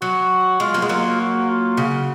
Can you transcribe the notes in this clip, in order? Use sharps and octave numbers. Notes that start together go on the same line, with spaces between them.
F#3 F#4
G#3 F4
F#3 A#3
G#3
F#3 A#3
F#4
F4
C#3 F#4